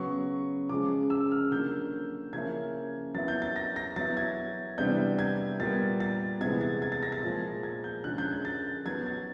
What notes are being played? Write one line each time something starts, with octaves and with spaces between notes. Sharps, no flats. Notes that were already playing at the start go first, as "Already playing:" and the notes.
Already playing: C#3 F#3 B3 C#6
C#3 F3 G#3 D6
E6
F6
D3 F#3 A#3 G6
C#3 F3 A#3 C#4 E4 G#6
F#3 B3 E4 A6
G6
A6
A#6
A#6
F#3 B3 E4 A6
G#6
C3 E3 G3 B3 D4 G6
G#6
A#2 G3 B3 A6
A6
C3 E3 G#3 B3 G#6
A6
G#6
A6
A#6
A6
A#2 F3 G#3
G#6
G6
D3 F3 G#3 C#4 F#6
G6
G#6
A6
F#3 B3 D#4 G#6
A6